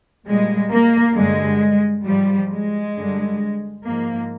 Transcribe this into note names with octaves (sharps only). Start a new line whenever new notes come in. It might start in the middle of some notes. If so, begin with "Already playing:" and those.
A#2 G3 G#3
A#3
G2 D3 G3 G#3
G#2 F3 G3
G#3
G2 D3 G3
G#2 F3 A#3